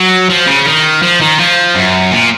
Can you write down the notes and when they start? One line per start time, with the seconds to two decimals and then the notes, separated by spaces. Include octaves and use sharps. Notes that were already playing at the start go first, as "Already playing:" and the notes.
Already playing: F#3
0.29 F3
0.47 C#3
0.66 D#3
1.02 F3
1.21 D#3
1.39 F3
1.75 F#2
2.12 A#2